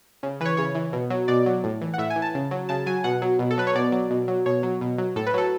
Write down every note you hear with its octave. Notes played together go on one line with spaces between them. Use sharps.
C#3
E3 B4
C#5
C#3 C#5
E3
B2
F#3
B2 D5
F#3
A2
E3
F#5
A2 E5
G#5
E3
A5
C#3
F#3
C#3 A5
F#3 G#5
B2 F#5
F#3
B2
A4
F#3 B4
C#5
B2 D5
F#3
B2
F#3
B2 C#5
F#3
B2
F#3
A2 A4
B4
F#3 A4